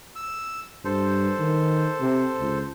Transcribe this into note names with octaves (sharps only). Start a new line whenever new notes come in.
E6
G2 A4 C5
D#3
C3
C#2